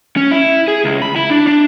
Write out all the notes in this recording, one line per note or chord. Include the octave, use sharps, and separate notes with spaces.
C#4
E4
G#4
C#2
B5
E4
D4
D4